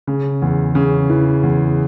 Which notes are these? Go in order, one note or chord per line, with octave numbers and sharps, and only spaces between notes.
C#3
E2
C#3
E3
E2